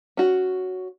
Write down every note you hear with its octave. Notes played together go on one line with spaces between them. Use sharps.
C#4 F#4